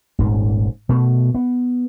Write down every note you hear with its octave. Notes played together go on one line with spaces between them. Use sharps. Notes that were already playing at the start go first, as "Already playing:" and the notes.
D#1 G#1 G#2
B2 A3
B3